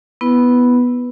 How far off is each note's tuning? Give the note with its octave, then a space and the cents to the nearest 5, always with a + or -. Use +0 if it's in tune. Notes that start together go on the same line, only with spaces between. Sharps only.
B3 +0 E4 +0 B4 +0